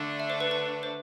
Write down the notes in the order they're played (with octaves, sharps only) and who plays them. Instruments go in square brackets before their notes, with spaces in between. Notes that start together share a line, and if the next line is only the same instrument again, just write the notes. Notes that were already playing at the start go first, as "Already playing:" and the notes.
Already playing: [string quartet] D3 A3 D4
[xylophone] E5
C5
B4
B4
C5